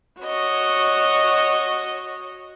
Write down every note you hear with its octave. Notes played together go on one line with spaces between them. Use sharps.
F#4 C#5 D#5